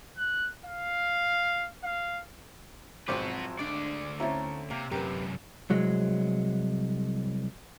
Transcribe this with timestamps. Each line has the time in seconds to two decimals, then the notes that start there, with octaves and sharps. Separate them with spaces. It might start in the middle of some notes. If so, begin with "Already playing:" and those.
0.17 F#6
0.65 F5
1.84 F5
3.08 G#1 F3 F#3 C4 F#4 B4 C5 D6
3.59 D2 G#3 D4 D5
4.20 A3 C4 C#4 E4 A#5
4.70 C3 A#3
4.91 F#2 C3 G4 A#4 B4
5.70 C2 F#3 G#3